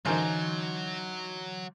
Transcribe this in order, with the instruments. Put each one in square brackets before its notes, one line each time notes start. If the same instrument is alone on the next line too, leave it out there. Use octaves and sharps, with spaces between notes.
[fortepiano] A1 A#4 C5 [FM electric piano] D3 E3 [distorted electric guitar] F#3 [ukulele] D#4 G#5